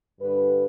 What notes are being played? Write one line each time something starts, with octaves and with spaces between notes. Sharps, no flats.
G2 D3 B4